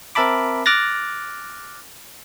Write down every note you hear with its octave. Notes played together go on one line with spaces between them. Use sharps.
C4 A#4 E5 A5 B5 D6
D6 F6 F#6 A6 A#6